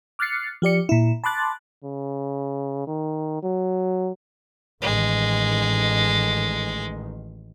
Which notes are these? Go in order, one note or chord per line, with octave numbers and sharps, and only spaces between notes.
D6 F6 F#6 A6 C7 C#7
F3 G4 D5 C#7
A#2 E4
A5 B5 C6 D6 F#6 A6
C#3
D#3
F#3
A1 D#3 G#3